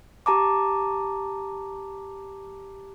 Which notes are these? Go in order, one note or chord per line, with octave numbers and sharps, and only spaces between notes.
G4 A5 A#5 D6